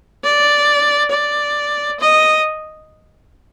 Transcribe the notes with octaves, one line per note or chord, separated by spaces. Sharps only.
D5
D5
D#5